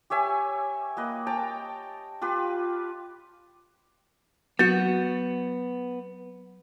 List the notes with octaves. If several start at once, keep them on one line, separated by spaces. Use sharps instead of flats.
G4 C#5 E5 G#5
A#3 B4 D#5
G5 A5 A#5
F4 G4 B4
F#3 B3 F#4 G6